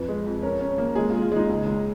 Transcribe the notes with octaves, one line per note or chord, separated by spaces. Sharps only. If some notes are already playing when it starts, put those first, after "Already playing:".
Already playing: F2 B4
G#3
F2
C#4 A#4
C#4
A#3
G#3 G#4
F4
G#3
F4
G#3 D#4
C#2
G#3